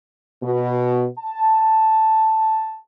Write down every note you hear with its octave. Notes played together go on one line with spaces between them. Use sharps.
B2
A5